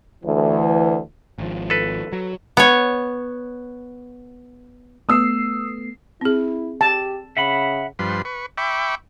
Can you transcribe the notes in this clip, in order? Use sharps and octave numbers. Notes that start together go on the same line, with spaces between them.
D2 E3
G#1 F3
A4 B4
F#3
B3 C#5
A3 B3 D#6 E6 C7
C4 E4 G#4
G4 A5
C#3 E5 F#5 B5
G2 F3 B4 C6
B4 C#6
E5 G5 B5 C#6 D6